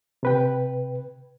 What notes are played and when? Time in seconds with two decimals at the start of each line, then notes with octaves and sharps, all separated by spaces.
0.23 C3 B4 G5